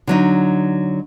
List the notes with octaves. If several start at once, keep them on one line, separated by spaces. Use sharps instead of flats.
D3 F#3 D#4